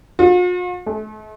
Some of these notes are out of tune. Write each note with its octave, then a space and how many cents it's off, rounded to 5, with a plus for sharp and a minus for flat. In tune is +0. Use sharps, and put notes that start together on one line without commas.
F4 +45
A3 -40